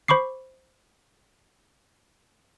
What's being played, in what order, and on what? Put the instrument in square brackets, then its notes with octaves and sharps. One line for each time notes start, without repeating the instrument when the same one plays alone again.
[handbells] C5 B5 C#6 D6 C7